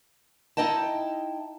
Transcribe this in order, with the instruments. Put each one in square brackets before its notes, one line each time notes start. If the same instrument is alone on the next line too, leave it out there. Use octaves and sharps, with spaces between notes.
[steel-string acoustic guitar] D#4 E4 D#5 G5 A5